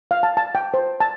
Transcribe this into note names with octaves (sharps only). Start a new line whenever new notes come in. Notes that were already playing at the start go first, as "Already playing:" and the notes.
F5
A5
A5
G5
C5
A5